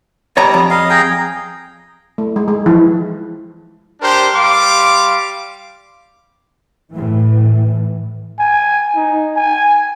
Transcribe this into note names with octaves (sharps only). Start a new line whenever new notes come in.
G3 C#5 D#5 A#5
F2
D#5 F5
G#4 G5 A#5
A3
G#3
G#3
E3 F3 E4
D4 G4 A#4 C5
G3 F5 C6 D6
A2 E3
G#5
D#4
G#5